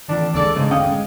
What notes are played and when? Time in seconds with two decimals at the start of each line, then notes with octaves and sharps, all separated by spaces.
0.08 F2 A2 D#3 E3 D4
0.35 D#2 D3 G#3 A4 D5
0.56 G#2 C#3 G#3
0.71 E1 D3 C#4 F5 G5 D#6
0.92 G#3